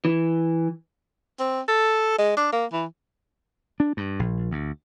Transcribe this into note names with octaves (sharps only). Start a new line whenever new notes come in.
E3
C4
A4
G#3
D4
A#3
E3
D4
G2
A#1
D2